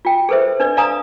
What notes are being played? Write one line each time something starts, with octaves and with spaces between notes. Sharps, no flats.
F4 G5
G#4 A4 B4 C5 E5
D4 B4 D5
D5 F5 G#5 A#5 D#6